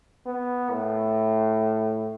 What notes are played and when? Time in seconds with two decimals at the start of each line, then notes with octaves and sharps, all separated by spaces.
0.26 B3
0.70 A2